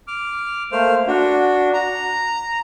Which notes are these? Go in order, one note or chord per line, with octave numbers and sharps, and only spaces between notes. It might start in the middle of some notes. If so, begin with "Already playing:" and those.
D6 F6
A3 A#3 C5 F6
D4 F#4
A#5